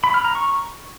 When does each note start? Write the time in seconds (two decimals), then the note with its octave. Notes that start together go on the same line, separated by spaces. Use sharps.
0.04 B5
0.14 F6
0.25 A#5
0.35 C#6